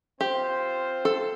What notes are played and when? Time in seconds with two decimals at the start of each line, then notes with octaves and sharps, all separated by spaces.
0.21 C4 F4 G4 C5
1.05 A4